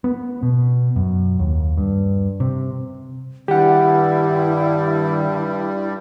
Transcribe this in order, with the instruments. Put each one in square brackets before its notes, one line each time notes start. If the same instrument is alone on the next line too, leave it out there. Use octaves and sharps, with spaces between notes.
[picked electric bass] B3
B2
F#2
D#2
G2
C3
[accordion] G2 G3 [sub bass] D#3 [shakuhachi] E4 [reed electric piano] G4 F#5